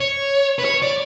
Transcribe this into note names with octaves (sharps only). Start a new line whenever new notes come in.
C#5
B4
C#5
D5